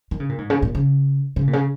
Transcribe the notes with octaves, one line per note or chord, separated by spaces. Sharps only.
D#3
C#3
A#2
G#2
C#3
A#2
C#3
C#3
A#2
C#3